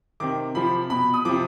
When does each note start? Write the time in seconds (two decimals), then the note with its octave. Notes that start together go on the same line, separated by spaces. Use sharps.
0.20 C3 D#3 D6
0.55 C3 F3 B5
0.90 B2 B5
1.14 D#6
1.25 C3 F3 D6